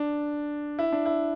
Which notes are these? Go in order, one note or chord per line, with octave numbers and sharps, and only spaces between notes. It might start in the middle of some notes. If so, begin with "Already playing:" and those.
Already playing: D4
E4
D4
E4